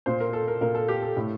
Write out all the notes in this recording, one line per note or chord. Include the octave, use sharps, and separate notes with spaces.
A#2 C5
A#4
A4
A#4
A#2 A#4
A4
G4
A4
A2